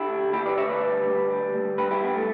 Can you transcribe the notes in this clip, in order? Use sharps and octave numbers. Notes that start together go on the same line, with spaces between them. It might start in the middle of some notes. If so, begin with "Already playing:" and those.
Already playing: D3 E4 G4
D2
D2 E4 G4
B4 D5
D2 C#5 E5
B4 D5
G3
D2
G3
D2
G2 G4 B4
E4 G4
G2 B3
A3